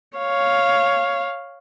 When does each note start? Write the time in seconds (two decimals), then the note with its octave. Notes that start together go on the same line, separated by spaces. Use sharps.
0.18 C#5 F5